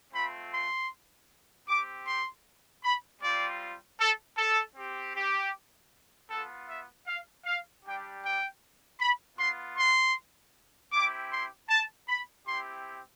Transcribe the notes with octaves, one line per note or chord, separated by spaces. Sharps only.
A3 C4 F4 B5
C6
C4 G4 D6
C6
B5
G3 C4 F4 D5
A4
A4
C4 G4
G4
B3 F4 A4
E5
F5
F5
G3 D4 G4 G5
G5
B5
B3 F4 C6
C6
C4 E4 G4 D6
C6
A5
B5
C4 E4 G4 C6